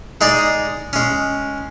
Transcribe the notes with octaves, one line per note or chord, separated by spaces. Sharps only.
G#3 D#4 G#4 D5
G#3 C#4